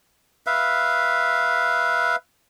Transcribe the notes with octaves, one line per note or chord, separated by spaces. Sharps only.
B4 E5 F5